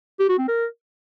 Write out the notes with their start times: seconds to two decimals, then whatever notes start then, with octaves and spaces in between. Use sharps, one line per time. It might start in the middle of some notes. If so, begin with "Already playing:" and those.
0.19 G4
0.29 F#4
0.39 C4
0.48 A#4